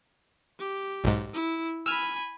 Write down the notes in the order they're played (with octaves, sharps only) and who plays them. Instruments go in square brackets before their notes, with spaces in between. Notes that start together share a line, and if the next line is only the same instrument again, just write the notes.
[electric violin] G4
[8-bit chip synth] B1 G#2
[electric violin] E4
[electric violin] G#5 B5 [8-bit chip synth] E6 F6